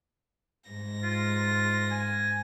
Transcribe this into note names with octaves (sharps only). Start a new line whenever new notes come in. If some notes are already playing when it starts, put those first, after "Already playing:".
G#2 A#6
F4
G#5